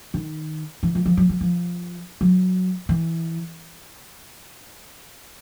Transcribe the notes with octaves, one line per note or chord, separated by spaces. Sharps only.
D#3
E3
F3
F3
F#3
F#3
F3
F#3
E3